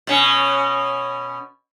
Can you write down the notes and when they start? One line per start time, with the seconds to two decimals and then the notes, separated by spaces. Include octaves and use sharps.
0.07 B2 C#4